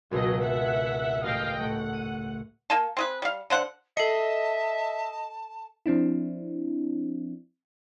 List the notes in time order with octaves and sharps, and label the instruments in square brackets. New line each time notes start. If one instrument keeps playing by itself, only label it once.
[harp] G#1 C#2 B2 [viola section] F#3 D#5
[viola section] E5 F#5
[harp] A1 D#7 [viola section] D#5 F5 G5
[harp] A2 A3 [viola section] F#5
[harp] D#7
[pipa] A#3 G#5 A5
C4 G#4 B4
G3 F5
D3 C5 F#5
[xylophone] A4 C7 C#7 [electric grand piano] D#5 [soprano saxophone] E5 [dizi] A5
[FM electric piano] F3 C4 D4 E4